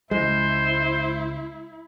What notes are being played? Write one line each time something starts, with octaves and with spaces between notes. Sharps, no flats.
C#2 G#3 E4 C5